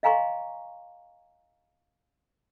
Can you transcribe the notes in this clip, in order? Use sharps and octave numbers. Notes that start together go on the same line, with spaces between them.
D#5 F5 G#5 A#5 C6 C#6